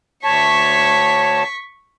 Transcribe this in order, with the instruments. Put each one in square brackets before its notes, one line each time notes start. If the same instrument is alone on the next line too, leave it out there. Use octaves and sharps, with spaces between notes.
[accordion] D2 C#5 A5 [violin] C#6 B6